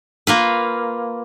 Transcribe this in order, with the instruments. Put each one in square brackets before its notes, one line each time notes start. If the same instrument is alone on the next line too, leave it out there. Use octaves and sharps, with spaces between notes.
[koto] A#3 F4 B4